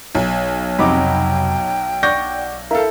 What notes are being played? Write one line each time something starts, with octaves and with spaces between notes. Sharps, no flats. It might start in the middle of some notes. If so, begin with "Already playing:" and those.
B1
F2 C3 F#3 D#4 G5 B5 D6
D5 F#5 C#6 G6 A#6
E4 A4 A#4 F5